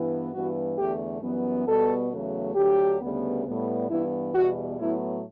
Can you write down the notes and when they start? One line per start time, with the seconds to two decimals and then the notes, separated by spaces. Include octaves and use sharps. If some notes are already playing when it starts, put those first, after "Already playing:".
Already playing: G2 E3 B3
0.33 G2 E3 B3 F#4
0.77 E2 D3 A3 G4
1.22 F#2 E3 G3 B3
1.67 B2 G3 B3 A4
2.11 E2 C#3 F#3 A3
2.55 D2 D3 F#3 G4
3.01 D2 C#3 G3 B3
3.45 A2 G3 B3
3.89 G2 E3 B3 E4
4.34 E2 B2 G3 B3 F#4
4.79 A2 F#3 B3 E4